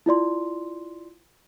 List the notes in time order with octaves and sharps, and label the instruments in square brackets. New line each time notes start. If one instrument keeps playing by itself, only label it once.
[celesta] E4 F4 D5 C6